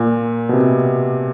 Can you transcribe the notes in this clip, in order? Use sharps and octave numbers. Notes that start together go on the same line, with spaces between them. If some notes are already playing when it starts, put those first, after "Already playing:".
Already playing: A#2
B2
C3